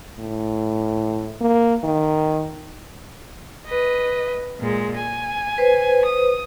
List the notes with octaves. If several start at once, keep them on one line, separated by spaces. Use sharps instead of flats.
A2
A#3
D#3
B4 D#5
A#2 G#3
G#5
B4 C5
D#6